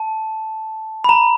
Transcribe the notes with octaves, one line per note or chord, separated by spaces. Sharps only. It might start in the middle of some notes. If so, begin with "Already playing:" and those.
Already playing: A5
B5
A#5